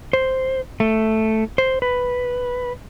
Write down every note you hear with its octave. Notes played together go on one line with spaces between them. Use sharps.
C5
A3
C5
B4